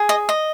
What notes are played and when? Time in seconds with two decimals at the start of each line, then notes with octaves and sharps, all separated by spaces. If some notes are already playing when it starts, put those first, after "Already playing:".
Already playing: G#4
0.09 D#5
0.29 D#5